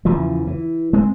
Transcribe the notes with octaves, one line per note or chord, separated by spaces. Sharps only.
E2 C#3 E3 F3
E3
G#3 C4